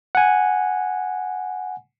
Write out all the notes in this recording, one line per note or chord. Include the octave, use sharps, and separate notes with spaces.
F#5 G#5